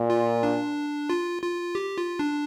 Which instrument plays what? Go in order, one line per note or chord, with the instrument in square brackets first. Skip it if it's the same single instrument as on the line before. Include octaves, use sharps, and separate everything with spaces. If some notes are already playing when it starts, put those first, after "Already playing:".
Already playing: [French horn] A#2
[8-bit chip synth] F4
D4
F4
F4
G4
F4
D4